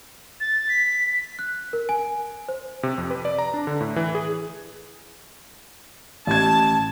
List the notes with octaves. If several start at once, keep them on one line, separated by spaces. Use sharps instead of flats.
A6
B6
F#6
A#4
G#5
C5
C3
F2
B4
D5
A#5
D4
D3
A2
E3
G#4
A1 A5 G#6